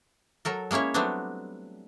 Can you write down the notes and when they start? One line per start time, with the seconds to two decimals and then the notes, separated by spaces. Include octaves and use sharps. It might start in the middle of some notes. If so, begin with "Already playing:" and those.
0.45 F#3 A4 A#4
0.71 G#3 A#3 C#4 E4 C#5
0.94 F#3 G3 A3 B3 C4 D4